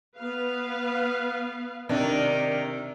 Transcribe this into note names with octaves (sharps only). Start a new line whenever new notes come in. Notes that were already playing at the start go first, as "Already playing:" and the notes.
B3 B4 F5
C3 D#3 D4 A#4